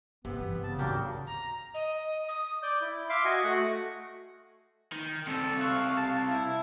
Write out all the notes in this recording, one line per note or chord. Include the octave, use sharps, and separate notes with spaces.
G1 C3 B3
E3
C#3 A5
G#1 D#2 F#3 A#3 D4 G4 A#4
A#5
D#5
D#6
D5 G6
E4
E5 F5 C6 D6
F#4 D#5 G#5 C#6
A3 F#4 F#5
D#3
C2 C3 A4
F5 C#6 E6 F#6
A5
E4